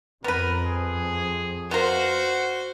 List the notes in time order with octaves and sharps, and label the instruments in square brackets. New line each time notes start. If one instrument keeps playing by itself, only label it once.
[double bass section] F2 [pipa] B3 B4 [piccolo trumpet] A#4
[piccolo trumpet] G#4
[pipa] B3 F4 A#4 [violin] F#4 C5 [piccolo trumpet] F#5